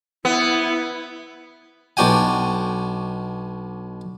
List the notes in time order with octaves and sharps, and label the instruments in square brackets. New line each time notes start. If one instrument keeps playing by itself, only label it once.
[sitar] B3 [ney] E4
[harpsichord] B1 D4 F#4 G5 G#5